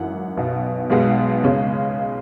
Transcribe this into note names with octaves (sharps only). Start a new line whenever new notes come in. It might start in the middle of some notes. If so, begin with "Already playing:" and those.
Already playing: G#1 F#2 E3 F#5
B1 B2 B3
B1 B2 G#3 B3
C#2 C#3 G#3 C#4